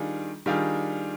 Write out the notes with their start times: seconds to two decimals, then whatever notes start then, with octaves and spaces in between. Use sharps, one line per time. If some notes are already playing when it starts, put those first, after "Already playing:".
Already playing: D#3 G3 D4 F4 G#4
0.46 D#3 G3 D4 F4 G#4